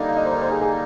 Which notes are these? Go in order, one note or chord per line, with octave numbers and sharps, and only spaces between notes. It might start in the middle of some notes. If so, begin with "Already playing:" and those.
Already playing: D3 G3 A#3 D#4
F5
D#5
C5
A#4
C5
G#4
G#4